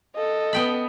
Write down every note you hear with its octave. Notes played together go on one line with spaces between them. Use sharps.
A4 D#5
B3 G5 B5